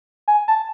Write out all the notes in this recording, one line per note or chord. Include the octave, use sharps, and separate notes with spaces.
G#5
A5